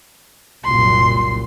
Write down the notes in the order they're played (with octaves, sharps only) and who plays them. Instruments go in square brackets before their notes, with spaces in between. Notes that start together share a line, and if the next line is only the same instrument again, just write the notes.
[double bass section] F#1 C2 A#2 [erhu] C6